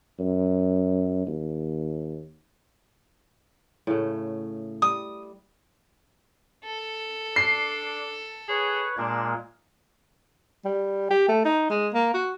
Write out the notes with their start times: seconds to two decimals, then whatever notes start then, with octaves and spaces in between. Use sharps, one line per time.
0.20 F#2
1.27 D#2
3.87 A2 C#3 A3
4.82 G3 D#6
6.65 A4
7.36 D4 C7
8.49 G#4 B4 C#5
8.98 A#2 G#3 A#3 D4
10.65 G3
11.10 G4
11.28 A3
11.45 D#4
11.70 G#3
11.94 A#3
12.14 F#4